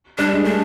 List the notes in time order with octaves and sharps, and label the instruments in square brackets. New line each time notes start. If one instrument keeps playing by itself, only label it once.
[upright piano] G3 [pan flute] D4
[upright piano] G#3
[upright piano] A3 [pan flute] D4